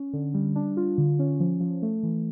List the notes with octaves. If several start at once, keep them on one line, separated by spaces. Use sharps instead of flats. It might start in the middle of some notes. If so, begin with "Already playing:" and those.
Already playing: C#4
D3
G3
D4
F4
D3
C#4
F3
F3
A3
E3